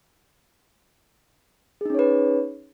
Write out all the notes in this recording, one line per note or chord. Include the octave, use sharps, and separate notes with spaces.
C#4 D#4 G#4 B4 C#5